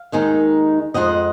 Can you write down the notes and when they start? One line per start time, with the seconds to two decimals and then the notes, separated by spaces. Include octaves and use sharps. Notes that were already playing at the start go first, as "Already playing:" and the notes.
Already playing: F5
0.12 D#2 D#3 G#3 D#4
0.94 F2 F3 G#3 D#5 F#5